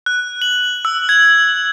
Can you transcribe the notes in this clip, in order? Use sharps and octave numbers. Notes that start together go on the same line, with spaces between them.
F#6
F#7
E6
G#6